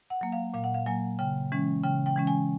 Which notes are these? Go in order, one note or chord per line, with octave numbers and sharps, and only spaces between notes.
F#5
F#3 A#3
F5
A#2 F5
F#5
F5
F#3 A#3 G#5
C#3 G5
E3 G#3 C#4
C#3 G5
G5
E3 G#3 C#4
G#5